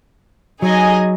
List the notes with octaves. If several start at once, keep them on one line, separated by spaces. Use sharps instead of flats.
F#3 D#4 G#4 D#5 G#5